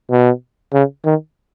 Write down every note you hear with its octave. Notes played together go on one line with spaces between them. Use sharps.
B2
C#3
D#3